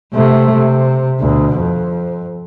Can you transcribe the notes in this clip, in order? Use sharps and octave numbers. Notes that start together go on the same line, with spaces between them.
C3 A3
C3
D2 B2
F2